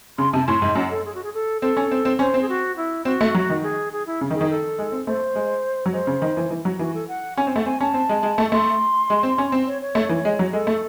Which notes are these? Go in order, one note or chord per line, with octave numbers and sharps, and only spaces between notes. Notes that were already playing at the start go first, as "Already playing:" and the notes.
C#3 C6
C3 A5
A2 C6
G#2
F#2 F#5
A4
G#4
F#4
G#4
A4
C4 A4
C#4
C4
C4
C#4 C5
C4
G#4
F#4
E4
C4 F#4
A3
F#3
D#3
G#4
G#4
E4
C#3
D#3
G#4
D#3
A4
G#3
C4
A3 C5
G#3
F#3
G#3 C5
C#3
D#3
E3
E3
F#3
E3 F#4
A4
F#5
C#4 G#5
C4
A3 F#5
C4 G#5
C#4 A5
C4
G#3
G#3
A3
A3 C6
G#3
C4
C#4
C4
C#5
C#5
A3
E3
G#3
F#3
G#3 A4
A3